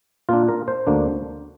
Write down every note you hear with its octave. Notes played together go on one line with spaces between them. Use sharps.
A#2 A#3 D4 F4
A#4
C5
D2 D3 A#3 D4